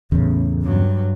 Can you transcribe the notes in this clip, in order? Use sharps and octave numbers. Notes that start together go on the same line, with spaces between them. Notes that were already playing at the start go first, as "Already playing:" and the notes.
A1 E2 C#3
G2 F#3